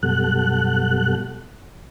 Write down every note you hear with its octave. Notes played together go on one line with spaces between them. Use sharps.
F#2 B2 G3 A4 F#5 F#6